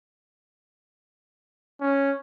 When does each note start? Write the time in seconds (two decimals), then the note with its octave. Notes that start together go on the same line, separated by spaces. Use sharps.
1.81 C#4